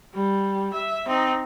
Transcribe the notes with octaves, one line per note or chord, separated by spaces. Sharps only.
G3
E5
C4 D#4